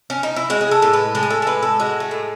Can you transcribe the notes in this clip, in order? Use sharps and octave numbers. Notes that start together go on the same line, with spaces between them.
C#4
D#4
E4
G#3 F#4
G#4
A4
A2
B4
G#3 A4
G#4
A4
A4
A2 B4
A4
G#3 F#4
A3
A2